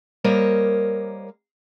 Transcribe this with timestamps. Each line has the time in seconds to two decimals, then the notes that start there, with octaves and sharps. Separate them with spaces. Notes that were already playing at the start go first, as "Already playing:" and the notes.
0.24 G3 A#3 A#4 C5 C#5 D#5